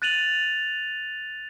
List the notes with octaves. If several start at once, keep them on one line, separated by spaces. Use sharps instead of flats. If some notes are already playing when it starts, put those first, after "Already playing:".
F#6 A6 D#7 F7 F#7